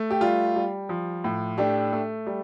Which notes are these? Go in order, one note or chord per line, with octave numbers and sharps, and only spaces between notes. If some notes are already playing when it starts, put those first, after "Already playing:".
Already playing: A3
G4
G3 F4
G3
F3
A2
A3 D4 G4
A3
G3